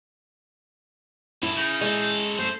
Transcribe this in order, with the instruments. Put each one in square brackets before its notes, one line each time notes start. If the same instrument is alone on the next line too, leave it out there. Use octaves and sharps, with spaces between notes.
[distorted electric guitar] F#2 A4 [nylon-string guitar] E4
[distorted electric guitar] C#3 [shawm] D#4
[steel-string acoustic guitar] G#3 [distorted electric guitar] C#4 A4
[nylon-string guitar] A3 [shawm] C5